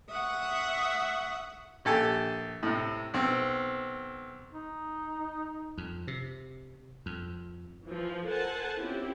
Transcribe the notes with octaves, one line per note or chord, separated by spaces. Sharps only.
E5 F#5 C#6 D#6
A#1 G4 A4 G#5
A2 C3
B1 C4
D#4
F2
C3
F2
E3 F3
A4 A#4 C5 F#5 G#5 A5
C4 C#4 E4 F4 G4